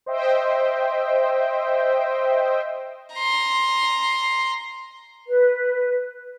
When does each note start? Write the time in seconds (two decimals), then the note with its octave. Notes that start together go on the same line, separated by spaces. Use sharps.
0.06 C5 D#5 E5 G5
3.14 A#5 C6
5.27 B4